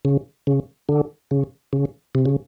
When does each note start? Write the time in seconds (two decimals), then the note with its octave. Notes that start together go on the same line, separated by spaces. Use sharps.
0.05 C#3
0.47 C#3
0.89 D3
1.31 C#3
1.73 C#3
2.15 C3
2.25 C#3